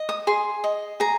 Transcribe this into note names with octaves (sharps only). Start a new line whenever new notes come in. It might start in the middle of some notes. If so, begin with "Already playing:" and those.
Already playing: D#5
D#6
G#4 C6
D#5
G#4 A#5